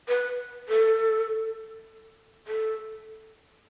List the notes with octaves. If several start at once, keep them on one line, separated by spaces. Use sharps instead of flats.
B4
A4
A4